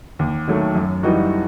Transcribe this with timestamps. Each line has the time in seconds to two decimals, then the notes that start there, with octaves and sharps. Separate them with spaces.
0.19 D#2
0.48 D#3 F#3 A3
0.75 F#2
1.03 E3 G3 D#4 F#4